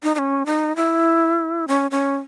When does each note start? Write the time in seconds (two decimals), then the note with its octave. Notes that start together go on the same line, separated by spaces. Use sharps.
0.03 D#4
0.15 D#4
0.19 C#4
0.46 D#4
0.76 E4
1.68 C#4
1.91 C#4